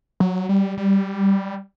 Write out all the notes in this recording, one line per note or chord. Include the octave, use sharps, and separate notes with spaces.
F#3
G3
G3